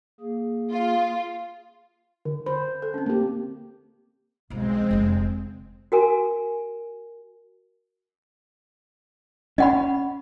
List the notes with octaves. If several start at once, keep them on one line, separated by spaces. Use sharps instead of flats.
A#3 G#4
F4
D3
C5 B5
A4
C4 C#4
A#3 G4
B1 F3 G#3 C4
F1 D3
F#4 A#4 G#5
C#4 D#5 F#5 B5